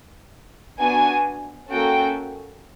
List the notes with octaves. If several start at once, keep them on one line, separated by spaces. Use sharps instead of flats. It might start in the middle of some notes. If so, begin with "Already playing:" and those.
B3 D4 F#4 G#5
A#3 C#4 F#4 A4 G5